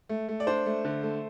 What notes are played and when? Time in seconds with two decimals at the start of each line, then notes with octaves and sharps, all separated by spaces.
0.09 A3
0.28 A3
0.40 D5
0.47 D4 C5
0.66 A3
0.85 D3
1.03 A3